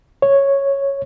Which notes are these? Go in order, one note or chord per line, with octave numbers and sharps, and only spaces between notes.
C#5